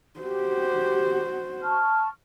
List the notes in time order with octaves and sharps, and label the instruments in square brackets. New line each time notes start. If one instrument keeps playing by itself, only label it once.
[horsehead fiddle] F#4 C5 [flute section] G4
[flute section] A5 C#6 F6